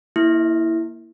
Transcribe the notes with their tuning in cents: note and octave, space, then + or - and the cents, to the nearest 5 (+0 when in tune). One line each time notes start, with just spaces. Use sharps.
A#3 +0 E4 +0